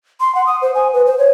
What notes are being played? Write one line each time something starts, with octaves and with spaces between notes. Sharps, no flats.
C6
F#5
D#6
C5
G#5
B4
C5
C#5